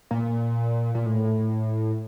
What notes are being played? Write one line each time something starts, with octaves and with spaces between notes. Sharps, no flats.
A#2
A#2
A2